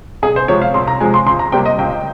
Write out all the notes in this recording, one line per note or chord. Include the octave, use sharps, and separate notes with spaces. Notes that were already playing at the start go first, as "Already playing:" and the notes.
C2 G#4
C5
C3 F3 G#3 C#5
F5
C2 C6
A#5
C3 F3 G#3 G#5
C6
C#2 C6
A#5
C3 G3 A#3 G5
D#5
C#2 G5